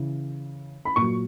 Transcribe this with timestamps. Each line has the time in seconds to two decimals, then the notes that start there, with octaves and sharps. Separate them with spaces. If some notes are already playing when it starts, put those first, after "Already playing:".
Already playing: C#3 E3
0.85 B5
0.96 A#2 F#3 C#6